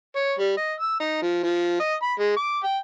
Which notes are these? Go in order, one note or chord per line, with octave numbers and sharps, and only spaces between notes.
C#5
G3
D#5
E6
D#4
F3
F3
D#5
B5
G#3
D6
G5